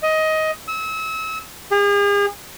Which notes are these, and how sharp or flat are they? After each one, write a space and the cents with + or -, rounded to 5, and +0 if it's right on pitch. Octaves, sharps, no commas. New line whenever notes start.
D#5 +15
E6 -35
G#4 -40